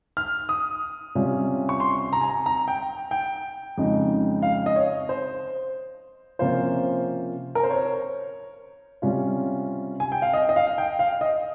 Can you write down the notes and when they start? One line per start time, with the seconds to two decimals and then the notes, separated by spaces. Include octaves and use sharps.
0.17 F6
0.49 D#6
1.15 C3 G3 C#4 F4
1.69 C#6
1.80 C6
2.13 A#5
2.21 G#5
2.29 A#5
2.46 A#5
2.68 G5
3.11 G5
3.78 F2 C#3 G#3 D#4
4.42 F5
4.66 D#5
4.76 C#5
5.09 C5
6.39 C3 F3 A#3 C#4 F4 C5
7.55 A#4
7.63 C5
7.71 C#5
9.02 C3 G3 C#4 F4
10.00 G#5
10.12 G5
10.22 F5
10.33 D#5
10.49 D#5
10.56 F5
10.78 G5
10.99 F5
11.21 D#5